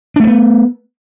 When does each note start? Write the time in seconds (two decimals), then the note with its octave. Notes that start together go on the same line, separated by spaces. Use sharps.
0.16 D4
0.20 A3
0.24 C#4
0.27 B3